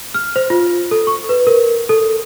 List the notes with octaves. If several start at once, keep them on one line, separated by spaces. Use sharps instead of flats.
F6
C5
F4
A4
C#6
B4
A#4
A4